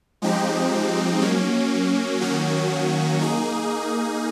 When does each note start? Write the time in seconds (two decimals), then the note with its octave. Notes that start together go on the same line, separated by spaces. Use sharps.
0.22 F3 G#3 C4 D#4 G4
1.21 F#3 A#3 C#4
2.21 D#3 F#3 A#3 C#4 F#4
3.20 A#3 D#4 G#4